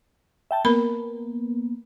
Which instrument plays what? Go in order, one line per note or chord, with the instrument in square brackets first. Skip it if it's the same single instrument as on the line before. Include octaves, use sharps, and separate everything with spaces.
[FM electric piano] E5 G5 A5
[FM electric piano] A#3 B3 [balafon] A#4 B5